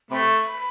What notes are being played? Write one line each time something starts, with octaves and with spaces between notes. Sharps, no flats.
C3 A3 B5